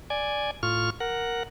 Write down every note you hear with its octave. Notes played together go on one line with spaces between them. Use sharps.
D5 G#5
A2 F4 C#6 F6
A#4 F#5